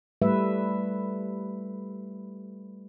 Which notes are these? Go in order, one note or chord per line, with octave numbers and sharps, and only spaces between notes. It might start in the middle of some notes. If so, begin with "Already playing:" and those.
G3 A3 B4 E5